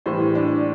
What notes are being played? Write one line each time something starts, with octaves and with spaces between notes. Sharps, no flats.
A2 E3 G3 C5
D4